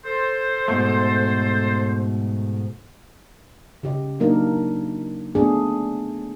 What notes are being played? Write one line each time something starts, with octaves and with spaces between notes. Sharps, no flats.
A4 C5
G#2 B2 A3
C#3 G4 D#5
F#3 A#3 D4 D#4 A#4
A3 B3 C4 D4 G#4